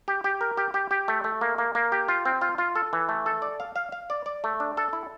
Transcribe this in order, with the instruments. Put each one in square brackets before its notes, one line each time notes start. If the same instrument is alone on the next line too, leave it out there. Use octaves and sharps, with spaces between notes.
[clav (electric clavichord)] G4
G4
A#4
G4
G4
G4
A3
A3
A#3
A#3
A#3
G4
F4
C4
F4
F4
A4
E3
A3
A4
D5
F5
F5
F5
D5
D5
A3
D4
A4
E4